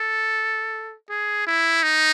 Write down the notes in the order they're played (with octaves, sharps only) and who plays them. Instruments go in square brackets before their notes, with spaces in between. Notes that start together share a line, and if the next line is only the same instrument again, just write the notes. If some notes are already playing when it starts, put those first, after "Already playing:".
Already playing: [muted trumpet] A4
G#4
E4
D#4